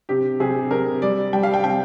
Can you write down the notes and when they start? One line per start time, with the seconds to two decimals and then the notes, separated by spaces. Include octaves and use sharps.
0.09 C3 G4
0.40 C3 G#4
0.71 C3 A#4
1.02 G3 D5
1.33 G3 G5
1.43 F5
1.54 G5
1.64 C3 G5